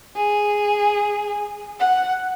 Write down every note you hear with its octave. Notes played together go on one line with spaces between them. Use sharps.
G#4
F#5